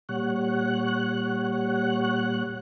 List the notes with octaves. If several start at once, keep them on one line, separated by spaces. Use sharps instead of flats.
A#2 G3 C#5 F#5 F#6